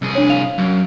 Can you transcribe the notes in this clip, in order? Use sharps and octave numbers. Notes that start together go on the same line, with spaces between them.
C2 G#4
D4 C#5
F5 F7
F#2